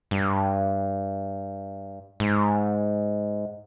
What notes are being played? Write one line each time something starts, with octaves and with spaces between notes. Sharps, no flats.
G2
G#2